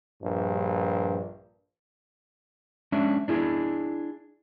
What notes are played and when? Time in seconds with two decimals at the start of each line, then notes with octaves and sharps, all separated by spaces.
0.22 A#1 G2
2.92 G#3 C#4 D4 E5
3.28 D4 E4 G#4